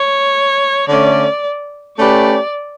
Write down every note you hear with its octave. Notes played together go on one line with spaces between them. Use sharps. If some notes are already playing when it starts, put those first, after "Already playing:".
Already playing: C#5
D3 A3 C#4 D5
A3 C#4 G4 B4 D5